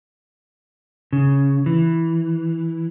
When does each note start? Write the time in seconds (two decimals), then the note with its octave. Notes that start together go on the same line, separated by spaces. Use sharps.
1.13 C#3
1.66 E3